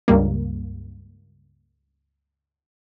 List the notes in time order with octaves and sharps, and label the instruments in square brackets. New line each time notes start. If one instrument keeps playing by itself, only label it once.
[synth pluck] C#2 G2 G3 A#3